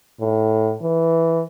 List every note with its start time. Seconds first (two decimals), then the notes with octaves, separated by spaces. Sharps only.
0.21 A2
0.82 E3